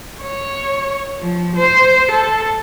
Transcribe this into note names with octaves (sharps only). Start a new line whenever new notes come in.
C#5
F3
C5
A4